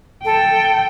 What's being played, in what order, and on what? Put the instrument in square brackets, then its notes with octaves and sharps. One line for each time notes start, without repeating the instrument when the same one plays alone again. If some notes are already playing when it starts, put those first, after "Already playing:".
[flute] A4 [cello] G5